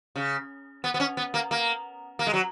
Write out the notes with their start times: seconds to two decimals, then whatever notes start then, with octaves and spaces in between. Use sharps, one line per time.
0.16 C#3
0.84 B3
0.94 B3
1.00 C#4
1.17 B3
1.34 A#3
1.51 A#3
2.19 A#3
2.27 G#3
2.33 F#3